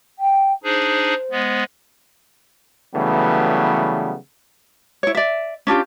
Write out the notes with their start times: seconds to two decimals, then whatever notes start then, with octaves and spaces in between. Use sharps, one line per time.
0.19 G5
0.64 D4 D#4 G#4 C5
1.31 G#3 B3
2.95 C#3 E3 F#3 G3 A3 B3
5.03 E4 C#5
5.15 D5 E5
5.67 C#4 D4 F4 G4